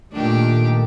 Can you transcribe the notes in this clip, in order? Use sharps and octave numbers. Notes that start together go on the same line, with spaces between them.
A#2 D#3 A3 D4 G4